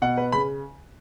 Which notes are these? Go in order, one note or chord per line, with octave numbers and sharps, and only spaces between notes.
B2 F#5
B4
C#3 B5